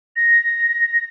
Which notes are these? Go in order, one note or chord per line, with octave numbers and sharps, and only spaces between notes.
A#6